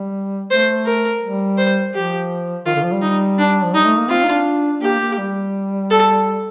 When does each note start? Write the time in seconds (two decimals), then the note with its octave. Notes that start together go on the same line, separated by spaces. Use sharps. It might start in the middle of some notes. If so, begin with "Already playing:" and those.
Already playing: G3
0.50 A3 C5
0.86 A#4
1.23 G3
1.58 C5
1.94 F3 G4
2.66 D#3 F4
2.75 D3
2.84 F3
2.93 G3
3.02 D#4
3.38 D4
3.65 F3
3.74 G3 D#4
3.86 A3
3.98 A#3
4.09 C4 F4
4.24 D#4
4.28 D4
4.81 A#3 G4
5.00 A#3
5.18 G3
5.91 A4